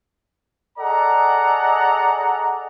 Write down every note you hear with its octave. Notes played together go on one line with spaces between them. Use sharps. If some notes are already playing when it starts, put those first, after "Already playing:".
G#4 A4 D5 D#5 F#5 A#5